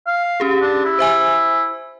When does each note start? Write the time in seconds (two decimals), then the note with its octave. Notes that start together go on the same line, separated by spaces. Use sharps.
0.07 F5
0.40 C#4 G4 G#4
0.62 D4
0.85 E4
0.99 C5 E5 G#5